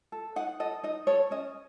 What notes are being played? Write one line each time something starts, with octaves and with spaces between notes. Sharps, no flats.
A4
D#4 F#5
A4 D#5
D#4 D#5
A4 C#5
C#4 D#5